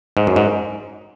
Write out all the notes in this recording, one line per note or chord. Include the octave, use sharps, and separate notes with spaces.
G#2
F#2
G#2